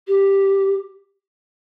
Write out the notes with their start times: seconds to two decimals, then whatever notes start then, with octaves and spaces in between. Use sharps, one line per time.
0.08 G4